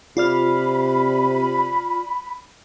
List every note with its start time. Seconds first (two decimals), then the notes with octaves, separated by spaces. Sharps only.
0.17 C3 F4 D5 B5 F6